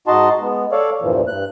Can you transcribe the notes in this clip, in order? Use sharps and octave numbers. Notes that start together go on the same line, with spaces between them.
G#2 D#4 F#4 D#5 A5 C6
G#3 B3
A4 C#5 D5 F5
E2 G2 A#2 E3 F3
G2 F#6